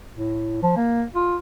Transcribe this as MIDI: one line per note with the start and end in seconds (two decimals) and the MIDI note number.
0.14 0.62 45
0.62 0.72 53
0.77 1.04 58
1.15 1.36 65